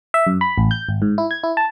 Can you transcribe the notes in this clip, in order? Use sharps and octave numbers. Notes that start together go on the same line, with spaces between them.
E5
F#2
B5
A1
G6
G#1
G#2
E4
G#6
E4
A5